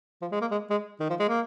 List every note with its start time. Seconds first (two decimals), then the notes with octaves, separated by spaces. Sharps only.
0.22 F3
0.32 G#3
0.41 A#3
0.51 G#3
0.70 G#3
1.00 D#3
1.10 F3
1.20 G#3
1.29 A#3